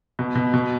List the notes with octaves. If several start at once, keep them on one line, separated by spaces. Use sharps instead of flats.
B2
B2
B2